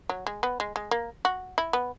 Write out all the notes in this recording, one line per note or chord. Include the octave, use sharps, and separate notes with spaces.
F#3
G#3
B3
G#3
G#3
A#3
F#4
E4
B3